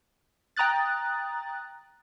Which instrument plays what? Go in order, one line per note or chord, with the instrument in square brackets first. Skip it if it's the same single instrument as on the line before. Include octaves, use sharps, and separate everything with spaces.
[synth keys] G5 A#5 D#6 F#6 A6